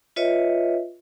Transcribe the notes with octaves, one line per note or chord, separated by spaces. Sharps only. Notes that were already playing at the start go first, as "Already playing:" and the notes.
F4 B4 C#5 D#5 E5